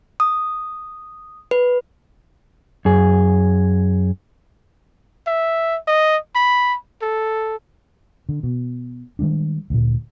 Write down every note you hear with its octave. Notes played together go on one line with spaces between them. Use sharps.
D#6
B4
F#2 G#4
E5
D#5
B5
A4
D3
B2
D#3 G3 G#3 D4
D2 A#2